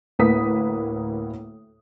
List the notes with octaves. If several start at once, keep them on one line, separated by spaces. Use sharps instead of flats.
D2 A2 A#3 B4 D#6 B6